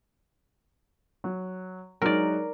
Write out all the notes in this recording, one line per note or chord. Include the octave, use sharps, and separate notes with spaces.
F#3
F#3 G#3 D#4 A#4 D5